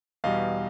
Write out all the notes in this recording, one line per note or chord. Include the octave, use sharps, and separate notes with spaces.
E2 B2 G3 D#5 F5